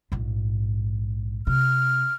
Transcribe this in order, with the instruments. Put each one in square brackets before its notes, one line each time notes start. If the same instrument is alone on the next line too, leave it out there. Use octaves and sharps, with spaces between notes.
[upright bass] A#1 G#2
[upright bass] C3 [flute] F6